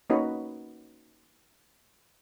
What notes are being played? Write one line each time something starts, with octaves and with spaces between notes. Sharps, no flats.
A#3 C#4 D#4 F#4 B4 D#5